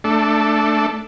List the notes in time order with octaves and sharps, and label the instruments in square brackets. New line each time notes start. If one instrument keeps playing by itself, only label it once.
[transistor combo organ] A3 D4 A4